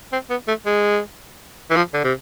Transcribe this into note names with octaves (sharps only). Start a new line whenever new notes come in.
C4
B3
A3
G#3
E3
F3
D3
C3